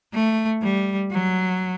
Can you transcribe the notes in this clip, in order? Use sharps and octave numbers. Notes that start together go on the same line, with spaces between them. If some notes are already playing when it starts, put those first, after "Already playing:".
A3
G3
F#3